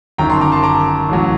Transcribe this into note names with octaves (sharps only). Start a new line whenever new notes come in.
G1 F#2 D#3 G5 A#5
A5 C6
A#5 D6
A5 C6
A#5 D6
A1 A2 F#3